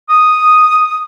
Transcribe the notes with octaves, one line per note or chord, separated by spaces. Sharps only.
D#6